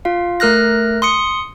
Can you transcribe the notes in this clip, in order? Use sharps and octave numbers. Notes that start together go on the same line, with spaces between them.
F4 F5
A3 A#4 F6 F#6 A#6
C6 D#6 C#7